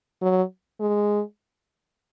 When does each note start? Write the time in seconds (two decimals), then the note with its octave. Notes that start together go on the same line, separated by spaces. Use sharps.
0.21 F#3
0.80 G#3